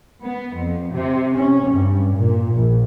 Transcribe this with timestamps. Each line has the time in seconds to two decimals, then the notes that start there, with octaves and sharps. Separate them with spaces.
0.23 B3
0.56 F2
0.93 C3
1.33 C#4
1.70 G2
2.16 A#2
2.54 A#1